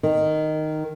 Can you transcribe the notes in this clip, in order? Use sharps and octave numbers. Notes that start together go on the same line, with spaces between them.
D#3